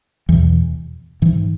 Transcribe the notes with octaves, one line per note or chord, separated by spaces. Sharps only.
E2 B2 E3
G#2 E3